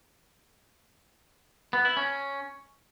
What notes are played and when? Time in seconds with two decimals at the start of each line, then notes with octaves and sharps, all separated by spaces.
1.73 B3
1.85 E4
1.97 C#4